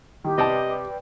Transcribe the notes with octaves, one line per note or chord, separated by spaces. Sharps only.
D#3 G4
C3 B4 D5 D#5 G5 A5